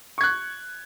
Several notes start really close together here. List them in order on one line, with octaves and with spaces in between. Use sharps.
C#6 G#6 F#6